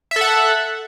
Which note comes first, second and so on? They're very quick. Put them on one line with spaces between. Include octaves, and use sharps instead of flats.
E5 A4 F#5